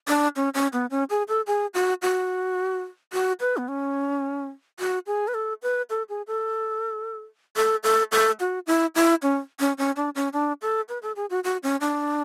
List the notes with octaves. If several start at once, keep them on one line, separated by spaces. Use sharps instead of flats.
D4
C#4
C#4
B3
C#4
G#4
A4
G#4
F#4
F#4
F#4
B4
B3
C#4
F#4
G#4
B4
A4
B4
A4
G#4
A4
A4
A4
A4
F#4
E4
E4
C#4
C#4
C#4
D4
C#4
D4
A4
B4
A4
G#4
F#4
F#4
C#4
D4